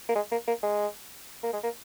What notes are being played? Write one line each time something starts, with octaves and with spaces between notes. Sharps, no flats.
A#3
G#3
A#3
A#3
G#3
A#3
G#3
A#3